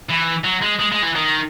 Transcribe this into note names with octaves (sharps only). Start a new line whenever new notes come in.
E3
F#3
G#3
G#3
G#3
E3
D#3